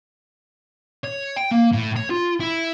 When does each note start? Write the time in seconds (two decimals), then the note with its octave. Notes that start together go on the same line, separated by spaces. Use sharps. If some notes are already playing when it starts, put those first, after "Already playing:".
1.04 C#5
1.36 G5
1.51 A#3
1.73 A2
1.97 C#5
2.10 F4
2.40 E4